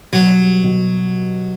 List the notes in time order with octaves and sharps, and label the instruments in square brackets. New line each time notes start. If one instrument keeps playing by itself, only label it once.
[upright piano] B2 [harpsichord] F#3
[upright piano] G3
B2